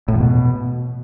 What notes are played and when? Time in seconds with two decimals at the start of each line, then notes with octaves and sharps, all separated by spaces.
0.08 A2
0.14 E2
0.20 B2